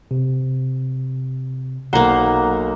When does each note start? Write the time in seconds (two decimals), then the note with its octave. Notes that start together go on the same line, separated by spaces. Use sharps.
0.11 C3
1.93 B1 A#3 C5 F#5 A#5